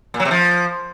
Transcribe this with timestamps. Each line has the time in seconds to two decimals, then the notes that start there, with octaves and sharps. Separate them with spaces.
0.14 A#2
0.20 F#3
0.25 C3
0.31 F3